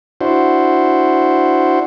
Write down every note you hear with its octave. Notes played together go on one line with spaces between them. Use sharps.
D4 E4 F#4 C5